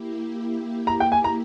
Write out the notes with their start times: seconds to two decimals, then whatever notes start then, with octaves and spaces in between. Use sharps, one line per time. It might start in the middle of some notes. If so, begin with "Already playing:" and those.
Already playing: A#3 E4 G4
0.87 A#5
1.00 G5
1.12 G#5
1.24 A#5